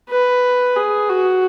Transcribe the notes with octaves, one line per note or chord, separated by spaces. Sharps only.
B4
G#4
F#4